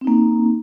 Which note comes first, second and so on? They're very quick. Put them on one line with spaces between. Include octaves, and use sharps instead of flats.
C4 D#4 A#3 C#4